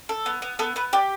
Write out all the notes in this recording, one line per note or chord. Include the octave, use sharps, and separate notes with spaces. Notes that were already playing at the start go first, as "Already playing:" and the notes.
A4
B3
B3
B3 A4
B3 B4
G4 D5